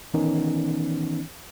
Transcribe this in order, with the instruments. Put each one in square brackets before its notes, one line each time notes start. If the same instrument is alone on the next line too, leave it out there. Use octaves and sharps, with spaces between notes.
[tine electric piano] D#3 E3 B3 C#4 D#4